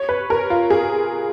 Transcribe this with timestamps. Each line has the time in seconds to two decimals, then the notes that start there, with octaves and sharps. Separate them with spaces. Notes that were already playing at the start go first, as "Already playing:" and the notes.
Already playing: C#5
0.09 B4
0.30 A#4
0.50 F4
0.70 G#4